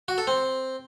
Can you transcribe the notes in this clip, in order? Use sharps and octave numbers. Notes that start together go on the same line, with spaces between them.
F#4
A4
C4